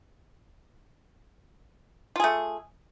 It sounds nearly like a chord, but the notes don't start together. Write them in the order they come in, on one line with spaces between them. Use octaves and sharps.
F4 G#4 A3